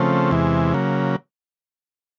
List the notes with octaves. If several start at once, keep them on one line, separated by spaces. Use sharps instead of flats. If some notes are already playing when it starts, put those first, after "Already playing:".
Already playing: C#3 F3 A3 C4
E2 C3 E3 G#3
C#3 F#3 A#3